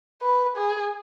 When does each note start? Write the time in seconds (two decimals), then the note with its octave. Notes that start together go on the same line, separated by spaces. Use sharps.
0.22 B4
0.57 G#4